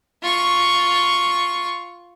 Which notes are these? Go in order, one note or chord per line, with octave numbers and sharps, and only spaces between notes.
F4 C#6